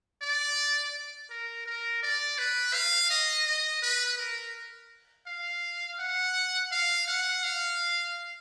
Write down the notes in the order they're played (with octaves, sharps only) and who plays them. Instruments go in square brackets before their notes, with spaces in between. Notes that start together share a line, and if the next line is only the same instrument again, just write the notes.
[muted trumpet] D5
A#4
A#4
D5
B4
F5
D#5
D#5
B4
A#4
F5
F#5
F5
F#5
F5